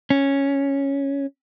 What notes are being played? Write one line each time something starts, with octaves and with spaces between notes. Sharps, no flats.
C#4